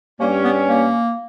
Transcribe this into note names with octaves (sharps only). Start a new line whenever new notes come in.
G2 G3 A#3 C#4
B3
A#3